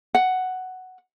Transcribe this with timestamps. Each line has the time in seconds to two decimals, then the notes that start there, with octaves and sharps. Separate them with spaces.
0.15 F#5